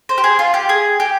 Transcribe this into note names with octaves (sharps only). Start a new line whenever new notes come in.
C5
G4
G#4
F4
G4
G#4
G4